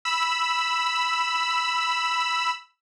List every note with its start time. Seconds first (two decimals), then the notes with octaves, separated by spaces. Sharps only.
0.05 B5 E6